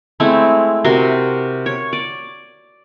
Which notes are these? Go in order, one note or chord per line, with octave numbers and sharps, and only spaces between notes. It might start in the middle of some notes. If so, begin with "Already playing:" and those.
G#3 A3 C4 E4
C3 F#4 A#4 C6
C#5
D5